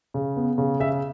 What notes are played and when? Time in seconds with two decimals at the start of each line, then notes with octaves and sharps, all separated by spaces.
0.14 C#3
0.36 B3
0.58 C#3
0.80 C#3 E5